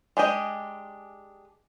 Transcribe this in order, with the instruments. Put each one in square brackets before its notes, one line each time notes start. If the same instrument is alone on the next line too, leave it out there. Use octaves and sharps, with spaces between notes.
[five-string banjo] G#3 D4 G4 D#5